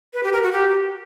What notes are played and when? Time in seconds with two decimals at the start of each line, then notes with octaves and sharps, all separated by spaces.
0.14 B4
0.23 G4
0.33 A#4
0.43 F#4
0.52 G4